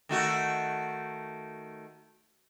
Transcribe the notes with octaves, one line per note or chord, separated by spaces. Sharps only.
D#3 A3 F#4